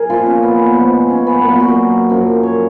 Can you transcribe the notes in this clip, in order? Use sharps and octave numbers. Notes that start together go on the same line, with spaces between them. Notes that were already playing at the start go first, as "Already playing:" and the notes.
Already playing: G#4 A#4
A#2 F3 F4
C#4
B3
G#2 F3
C#4
B3
A#2 F#3 A#3
F4
F#4
A#4
F#2 F3
C#5